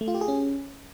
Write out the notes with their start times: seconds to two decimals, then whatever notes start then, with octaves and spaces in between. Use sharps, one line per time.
0.01 A3
0.08 F4
0.14 G4
0.21 G#4
0.28 C#4